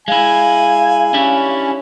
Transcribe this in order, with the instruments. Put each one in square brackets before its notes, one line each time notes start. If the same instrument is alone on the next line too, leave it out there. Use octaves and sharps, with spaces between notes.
[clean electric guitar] G#3 E4 [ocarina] F5 [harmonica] G#5
[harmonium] C#4 [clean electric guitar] D4 E4 G4